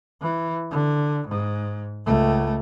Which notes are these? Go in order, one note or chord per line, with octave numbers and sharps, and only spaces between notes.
E3
D3
G#2
C#2 A3